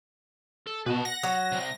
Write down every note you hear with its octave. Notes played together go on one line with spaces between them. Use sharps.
A4
B2 B4 A5
F#5 A#6
F#3
C3 G3